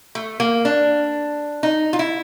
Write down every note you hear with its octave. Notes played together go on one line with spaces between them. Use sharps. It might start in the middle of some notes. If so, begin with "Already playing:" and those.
A3
A#3
D4
D#4
F4
E4